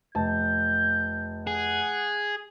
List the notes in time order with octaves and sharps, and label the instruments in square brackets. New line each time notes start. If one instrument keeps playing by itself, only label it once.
[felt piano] F1 A5 [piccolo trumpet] G6
[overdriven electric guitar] G#4 [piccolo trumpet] F#5